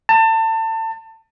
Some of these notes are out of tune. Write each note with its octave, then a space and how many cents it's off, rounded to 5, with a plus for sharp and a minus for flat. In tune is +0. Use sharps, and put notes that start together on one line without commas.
A5 +30